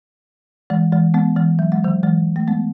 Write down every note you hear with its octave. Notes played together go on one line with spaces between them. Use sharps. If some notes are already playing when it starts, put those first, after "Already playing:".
E3 G#3
E3 G#3
G#3 B3
E3 G#3
F#3
G#3
D#3 F#3
E3 G#3
A3
G#3 B3